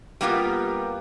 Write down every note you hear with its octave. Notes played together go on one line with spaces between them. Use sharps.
G3 A#3 B3 F4 G4